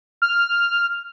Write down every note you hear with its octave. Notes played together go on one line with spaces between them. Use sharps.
F6